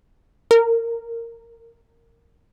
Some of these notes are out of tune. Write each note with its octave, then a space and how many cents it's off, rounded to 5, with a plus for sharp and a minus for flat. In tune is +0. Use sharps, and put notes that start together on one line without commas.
A#4 -15